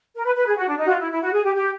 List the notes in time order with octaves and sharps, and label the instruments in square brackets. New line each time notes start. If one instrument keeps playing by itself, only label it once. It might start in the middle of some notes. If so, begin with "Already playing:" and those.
[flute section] A#4
B4
B4
G#4
F#4
D4
D#4
F#4
F4
E4
E4
F#4
G#4
G4
G4